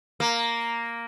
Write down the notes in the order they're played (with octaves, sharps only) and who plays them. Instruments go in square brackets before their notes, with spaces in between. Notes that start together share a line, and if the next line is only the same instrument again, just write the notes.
[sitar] A#3